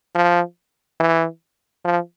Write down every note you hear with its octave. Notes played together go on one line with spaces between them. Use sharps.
F3
E3
F3